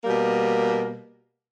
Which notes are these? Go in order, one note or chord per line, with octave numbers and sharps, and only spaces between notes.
B2 G3 A#3